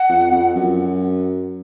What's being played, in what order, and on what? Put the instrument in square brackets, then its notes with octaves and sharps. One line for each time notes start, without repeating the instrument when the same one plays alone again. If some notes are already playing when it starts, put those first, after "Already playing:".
Already playing: [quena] F#5
[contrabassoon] F2
F2
F#2